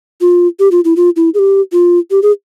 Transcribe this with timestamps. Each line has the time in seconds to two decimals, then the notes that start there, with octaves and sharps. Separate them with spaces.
0.21 F4
0.59 G4
0.72 F4
0.85 E4
0.97 F4
1.16 E4
1.34 G#4
1.39 G4
1.72 F4
2.11 G4
2.23 G#4